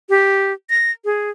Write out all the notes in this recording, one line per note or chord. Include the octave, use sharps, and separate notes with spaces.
G4
A#6
G#4